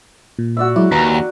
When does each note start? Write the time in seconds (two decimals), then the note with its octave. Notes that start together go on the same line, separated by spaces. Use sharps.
0.39 A#2
0.57 F#4 D5 E5 E6
0.76 F#3 G#3 E4 D5
0.92 D#2 B4 A#5
1.14 F#5